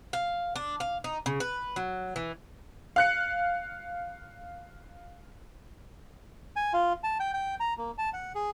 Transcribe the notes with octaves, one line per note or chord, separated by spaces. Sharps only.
F5
D4
F5
D#4
C#3
B4
F#3
E3
F5 F#6 C#7
G#5
F4
A5
G5
G5
A#5
A#3
A5
F#5
G#4